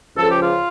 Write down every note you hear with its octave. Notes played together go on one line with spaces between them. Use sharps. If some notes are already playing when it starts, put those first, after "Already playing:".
C#2 C#3 F3 A4
G4
F4